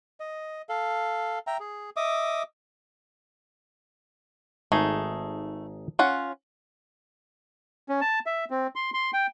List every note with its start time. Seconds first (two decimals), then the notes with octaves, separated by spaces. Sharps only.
0.20 D#5
0.69 A4 F5
1.47 E5 G5 A#5
1.60 G#4
1.96 D#5 E5 D6 D#6
4.72 G#1 A3 D#4 G#4
5.99 C#4 F4 F#5
7.89 C#4
8.01 A5
8.26 E5
8.50 C4
8.75 C6
8.94 C6
9.13 G5